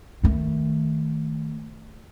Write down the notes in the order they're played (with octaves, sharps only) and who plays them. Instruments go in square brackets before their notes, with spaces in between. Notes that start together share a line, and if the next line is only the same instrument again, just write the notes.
[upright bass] D#3 A3